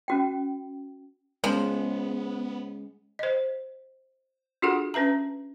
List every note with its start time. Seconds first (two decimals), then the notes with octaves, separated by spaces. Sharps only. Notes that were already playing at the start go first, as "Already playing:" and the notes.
0.08 C#4 F#4 G5
1.44 F3 G#3 B3 C#4
3.19 C5 D#5
4.62 D4 F4 F#4 G#4 A4 F#5
4.94 C#4 B4 E5 A#5